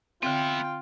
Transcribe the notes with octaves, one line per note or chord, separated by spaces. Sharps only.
D3 B3 C4 F4 E5 G5